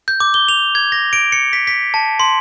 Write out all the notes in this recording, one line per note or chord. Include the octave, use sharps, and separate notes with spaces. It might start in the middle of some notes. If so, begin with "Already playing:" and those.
G6
D6
G7
F7
G#6
A#6
D7
C#7
B6
B6
A5
C6